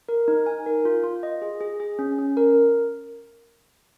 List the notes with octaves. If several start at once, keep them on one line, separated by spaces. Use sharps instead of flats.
A#4
D#4
G#5
A#4
F4
F4
D#5
G#4
G#4
G#4
C#4
C#4
A#4